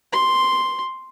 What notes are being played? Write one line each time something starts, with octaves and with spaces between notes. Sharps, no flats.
C6